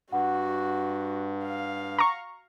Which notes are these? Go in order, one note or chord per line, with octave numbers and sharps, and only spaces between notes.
G2 F#4 F#5
F5
A#5 C#6